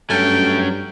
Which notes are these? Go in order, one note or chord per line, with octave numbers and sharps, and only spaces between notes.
G2 F#3 A3 C#4 G5